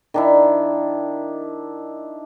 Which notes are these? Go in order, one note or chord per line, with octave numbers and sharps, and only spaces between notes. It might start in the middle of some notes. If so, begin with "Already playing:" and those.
D#3 D4 E4